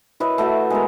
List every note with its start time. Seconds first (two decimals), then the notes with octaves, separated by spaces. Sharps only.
0.20 E4 B4 C#5 D#5
0.38 A3 F#4 E5 A5
0.70 G#3 B3 A#4